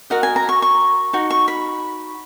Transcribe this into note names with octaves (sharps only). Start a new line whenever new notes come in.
F#4 A#4 D#5 F#5
G#5
A#5
C#6
C#6
D#4 F#4
C#6
B5